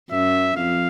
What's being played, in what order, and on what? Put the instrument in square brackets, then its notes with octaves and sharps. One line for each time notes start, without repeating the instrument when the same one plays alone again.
[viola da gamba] F#2 [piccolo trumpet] E5
[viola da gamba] F2 [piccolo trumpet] F5